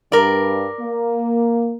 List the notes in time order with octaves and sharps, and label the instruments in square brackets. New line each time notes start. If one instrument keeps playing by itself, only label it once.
[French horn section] G2 [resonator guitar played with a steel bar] A#4 D5
[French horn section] A#3